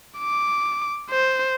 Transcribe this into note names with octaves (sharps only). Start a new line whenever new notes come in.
D6
C5